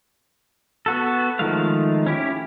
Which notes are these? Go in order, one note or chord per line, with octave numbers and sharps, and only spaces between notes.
B3 F#4 A4
D#3 F3 G#3 A3 F5
C#4 E4 G4